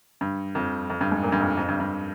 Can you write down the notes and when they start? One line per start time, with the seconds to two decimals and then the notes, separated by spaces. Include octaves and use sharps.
0.21 G2
0.55 F2
0.90 F2
1.01 G2
1.12 G#2
1.23 A#2
1.32 G2
1.40 F2
1.57 F2
1.68 G2
1.80 G2